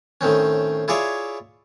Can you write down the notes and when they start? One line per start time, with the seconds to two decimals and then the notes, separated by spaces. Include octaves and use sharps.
0.21 A2 D#3 C4 C#4
0.88 E4 F4 G#4 C#5 D5 E5